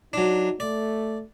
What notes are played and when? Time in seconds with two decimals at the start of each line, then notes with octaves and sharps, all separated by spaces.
0.13 F#3 D4 D#4
0.60 A3 D5